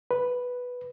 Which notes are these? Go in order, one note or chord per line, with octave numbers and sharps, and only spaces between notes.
B4